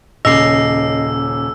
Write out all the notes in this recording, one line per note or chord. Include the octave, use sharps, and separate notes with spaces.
D#1 C#3 D#5 D6 E6 C7